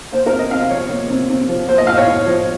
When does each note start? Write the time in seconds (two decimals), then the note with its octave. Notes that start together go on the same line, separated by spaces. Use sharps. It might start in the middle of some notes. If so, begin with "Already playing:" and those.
0.12 A#3 C5
0.26 A#4
0.32 C3
0.39 D#5
0.51 C3 F5
0.71 F3 C#5
0.90 A#3
1.10 C3
1.30 C3
1.49 F3
1.68 A#3 C5
1.78 D#5
1.87 A2 F5
1.98 C#5
2.07 A2
2.27 F3